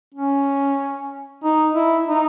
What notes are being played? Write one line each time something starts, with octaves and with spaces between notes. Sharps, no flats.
C#4
D#4
E4
D#4